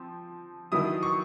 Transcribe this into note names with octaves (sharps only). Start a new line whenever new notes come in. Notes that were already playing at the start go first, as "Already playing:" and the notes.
Already playing: F3 C4
D#3 F#3 B3 E4 D#6
C#6